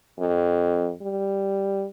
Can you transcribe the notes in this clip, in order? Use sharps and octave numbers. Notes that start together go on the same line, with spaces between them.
F2
G3